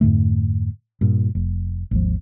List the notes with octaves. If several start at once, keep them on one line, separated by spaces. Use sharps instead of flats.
F2 G#2 D3 A3
G2 A#2
F1
G#1 D#2 F3